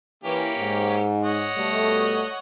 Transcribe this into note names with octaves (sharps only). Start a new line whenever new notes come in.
E3 A#3 C#4 G4
G#2
C#5 D#5 F#5
B2 G3 A3